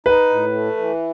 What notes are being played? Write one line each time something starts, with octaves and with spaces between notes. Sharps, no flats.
D#4 B4
A2
A3
E3